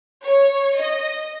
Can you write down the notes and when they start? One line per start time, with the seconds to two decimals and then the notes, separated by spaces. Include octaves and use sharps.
0.24 C#5
0.77 D#5